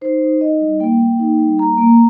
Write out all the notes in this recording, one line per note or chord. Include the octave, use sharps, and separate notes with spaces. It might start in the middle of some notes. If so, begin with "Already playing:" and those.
D#4 C5
D#4
D#4 D#5
G3
A#3 G5
A#3
D#4
G3
A#3 A#5
A#3